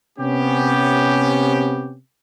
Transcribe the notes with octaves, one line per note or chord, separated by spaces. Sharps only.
C3 B3 C#4 G4